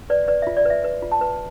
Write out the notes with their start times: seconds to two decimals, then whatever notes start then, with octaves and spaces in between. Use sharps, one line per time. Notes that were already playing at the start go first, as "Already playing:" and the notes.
0.10 B4 D5
0.28 B4 D5
0.42 E5
0.47 F4
0.57 D5
0.65 B4 E5
0.84 B4
1.02 F4
1.12 A5
1.21 B4